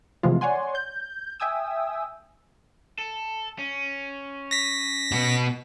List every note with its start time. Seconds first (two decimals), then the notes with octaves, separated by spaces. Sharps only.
0.23 C3 E3 F3 G#3 A3 F4
0.41 C#5 D5 F#5 G#5 C6
0.75 G6
1.40 E5 G5 G#5 D#6 E6
2.98 A4
3.59 C#4
4.51 A#6 B6
5.12 B2 B3